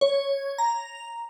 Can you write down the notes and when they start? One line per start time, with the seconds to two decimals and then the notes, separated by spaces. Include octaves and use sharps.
0.01 C#5
0.58 A#5